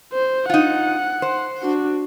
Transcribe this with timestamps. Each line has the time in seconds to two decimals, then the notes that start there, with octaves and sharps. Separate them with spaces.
0.13 C5
0.50 D#4 F4 F#5
1.22 C5
1.62 D4 F#4